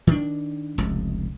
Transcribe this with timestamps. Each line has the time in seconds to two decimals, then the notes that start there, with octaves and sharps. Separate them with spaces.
0.07 D#3 D4
0.78 F1 C#2